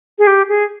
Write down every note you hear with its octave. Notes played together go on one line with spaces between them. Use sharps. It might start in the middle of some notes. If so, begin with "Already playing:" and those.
G#4
G4
G#4